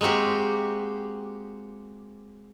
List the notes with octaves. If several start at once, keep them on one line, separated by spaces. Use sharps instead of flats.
G#3 A#3 C4 F#4 G4